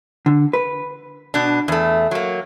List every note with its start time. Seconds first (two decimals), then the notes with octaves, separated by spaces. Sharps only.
0.26 D3
0.53 B4
1.34 B2 D4
1.68 E2 A3
2.11 F#3 A#3